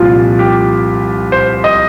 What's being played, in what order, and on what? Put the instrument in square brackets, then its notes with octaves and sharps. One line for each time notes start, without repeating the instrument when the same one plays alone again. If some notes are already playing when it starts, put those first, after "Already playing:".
Already playing: [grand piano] C2 A#2 F3 F4
G4
C5
D#5